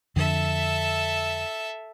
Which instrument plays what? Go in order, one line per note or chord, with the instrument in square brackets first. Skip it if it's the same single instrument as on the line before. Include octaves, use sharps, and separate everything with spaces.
[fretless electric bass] F2 D3 [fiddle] A4 E5